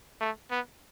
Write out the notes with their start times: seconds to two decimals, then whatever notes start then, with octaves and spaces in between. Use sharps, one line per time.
0.21 A3
0.51 B3